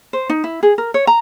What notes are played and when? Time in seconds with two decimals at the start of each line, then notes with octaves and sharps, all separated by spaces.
0.13 C5
0.30 D#4
0.44 E4
0.63 G#4
0.78 A#4
0.94 C#5
1.07 A#5